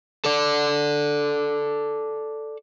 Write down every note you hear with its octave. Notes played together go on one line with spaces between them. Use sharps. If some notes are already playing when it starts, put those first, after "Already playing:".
A4 D5